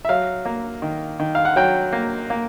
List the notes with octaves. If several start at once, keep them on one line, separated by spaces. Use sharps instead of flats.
E5
F#3 F5
A#3
D#3
D#3
F5
F#5
F#3 G5
A#3
A#3